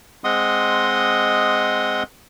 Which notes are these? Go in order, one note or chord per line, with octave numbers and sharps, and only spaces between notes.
G#3 C4 D#5 F#5 C6 D#6